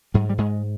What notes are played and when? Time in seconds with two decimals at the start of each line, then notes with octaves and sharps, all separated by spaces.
0.14 G#2 G3
0.29 G3
0.38 G#2 G#3